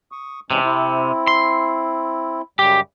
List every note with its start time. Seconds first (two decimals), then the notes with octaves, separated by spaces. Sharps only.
0.12 C#6 D#6
0.51 C3 E3 G#3 C#4
0.64 C4 E4
1.27 C6
2.59 F#2 C#3 G3 G4